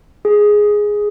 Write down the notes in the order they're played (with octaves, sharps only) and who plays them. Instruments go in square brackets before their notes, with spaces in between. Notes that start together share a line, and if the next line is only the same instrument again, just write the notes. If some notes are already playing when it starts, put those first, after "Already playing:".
[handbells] G#4